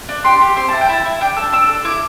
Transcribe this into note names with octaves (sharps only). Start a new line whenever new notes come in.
D4
G4 C6
G4
C4 C6
E4 A5
G5
E4 A5
E4
D4 G5
A4 A5
D4 E6
A4
E4 D6